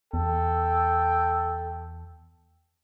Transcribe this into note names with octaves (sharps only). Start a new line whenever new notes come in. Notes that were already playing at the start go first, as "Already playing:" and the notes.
E2 A4 G5